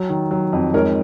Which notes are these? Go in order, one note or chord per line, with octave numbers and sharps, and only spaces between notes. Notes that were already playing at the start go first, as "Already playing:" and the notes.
Already playing: F#3
D#3
F#3
F2
G#2 A#4 C#5